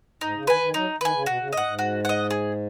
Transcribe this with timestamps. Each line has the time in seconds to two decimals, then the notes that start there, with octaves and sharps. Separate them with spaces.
0.21 G#2 D#4
0.35 C#3
0.47 D#3 B4 G#5
0.61 D#3
0.74 F#3 D#4
1.00 D#3 B4 G#5
1.14 C#3
1.26 B2 F#4
1.40 C#3
1.53 G#2 D#5
1.57 F#5
1.66 G#2
1.79 F#4
2.05 D#5 F#5
2.30 G#4